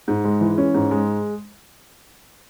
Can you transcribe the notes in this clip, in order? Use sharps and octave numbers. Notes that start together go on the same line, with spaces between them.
G#2
G#3
E3
C#4
G#2
G#3